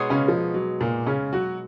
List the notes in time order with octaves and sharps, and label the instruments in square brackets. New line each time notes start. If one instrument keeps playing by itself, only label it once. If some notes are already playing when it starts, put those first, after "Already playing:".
Already playing: [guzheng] B2 G#3 D#4 G#4 C#5
[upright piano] C#3 C#4
F3
F#3
A#2 A#3
C#3 C#4
F#3 F#4